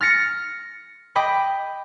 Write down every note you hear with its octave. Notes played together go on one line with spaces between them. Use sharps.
F6 A6 A#6 C#7
D#5 G5 B5 D6